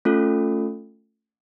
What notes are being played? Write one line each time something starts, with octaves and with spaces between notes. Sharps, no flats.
A3 C#4 F4 A4